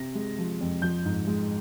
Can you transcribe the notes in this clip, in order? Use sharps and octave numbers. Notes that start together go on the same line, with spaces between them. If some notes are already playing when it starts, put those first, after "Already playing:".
Already playing: C3 A#6
G#3
F3
F2
F3 G6
G#2
G#3